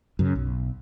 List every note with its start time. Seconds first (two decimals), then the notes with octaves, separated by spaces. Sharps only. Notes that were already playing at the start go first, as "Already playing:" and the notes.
0.19 F#2 C#3
0.36 B1